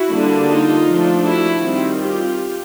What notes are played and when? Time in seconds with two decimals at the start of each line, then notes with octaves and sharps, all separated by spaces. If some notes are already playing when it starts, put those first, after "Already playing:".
Already playing: E4 F#4
0.11 D3 G3 A#3 D4
0.49 D#4 F4
0.86 F3 A3 D4
1.25 E4 F#4
1.63 D#3 G3 C4
2.01 F4 G4